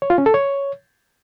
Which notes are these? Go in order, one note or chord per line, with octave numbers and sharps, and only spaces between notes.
C#5
F4
C#4
A4
C#5